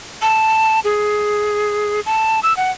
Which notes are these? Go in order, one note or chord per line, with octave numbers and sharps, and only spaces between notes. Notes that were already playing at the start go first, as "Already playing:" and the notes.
A5
G#4
A5
E6
F#5